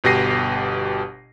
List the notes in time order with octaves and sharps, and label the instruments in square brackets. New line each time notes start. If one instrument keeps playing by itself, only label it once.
[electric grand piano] G1 B2 G4 A#6 C7 D#7